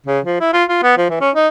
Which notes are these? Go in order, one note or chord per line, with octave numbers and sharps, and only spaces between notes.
C#3
F3
E4
F4
F4
B3
F3
E3
C#4
D#4